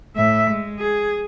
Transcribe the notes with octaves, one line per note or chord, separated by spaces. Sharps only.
A2 E5
G#3
G#4